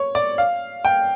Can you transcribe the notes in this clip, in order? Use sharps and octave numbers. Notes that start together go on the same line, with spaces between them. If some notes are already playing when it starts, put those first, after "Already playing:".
Already playing: C#5
D5
F5
G5